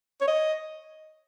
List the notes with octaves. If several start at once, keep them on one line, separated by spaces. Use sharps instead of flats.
C#5
D#5